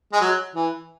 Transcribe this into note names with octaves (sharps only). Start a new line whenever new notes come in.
G#3
F#3
E3